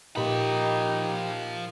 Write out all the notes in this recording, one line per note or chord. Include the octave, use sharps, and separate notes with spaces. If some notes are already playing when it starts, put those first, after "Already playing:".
A#2 F3 D#4 G4 B5